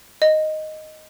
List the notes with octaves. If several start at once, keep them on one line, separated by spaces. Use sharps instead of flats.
D#5